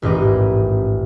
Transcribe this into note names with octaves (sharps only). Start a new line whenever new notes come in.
D#1 A1 G#2 D#5 D6